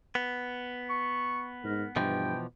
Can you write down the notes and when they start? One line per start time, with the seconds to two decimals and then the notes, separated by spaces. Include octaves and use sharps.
0.15 B3
0.90 C#6
1.64 G#2 A#4
1.96 G2 B2 E3 F3 G5